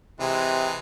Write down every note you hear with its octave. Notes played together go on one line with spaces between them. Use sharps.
C3 E3 G#3